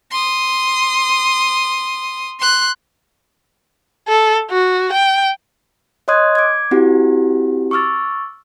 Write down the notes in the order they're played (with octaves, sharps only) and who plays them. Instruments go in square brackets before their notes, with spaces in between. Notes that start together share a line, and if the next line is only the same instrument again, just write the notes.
[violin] C6 D#6
C6 F#6
[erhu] A4
F#4
G5
[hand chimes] C#5 D#5 C6 D#6 F#6 G#6
D6 G#6
C4 E4 F#4 G4
C#6 D6 E6 F6 A6